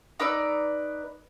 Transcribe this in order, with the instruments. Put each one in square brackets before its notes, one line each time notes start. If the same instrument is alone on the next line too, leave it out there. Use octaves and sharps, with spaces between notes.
[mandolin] D#4 B4 D5 E6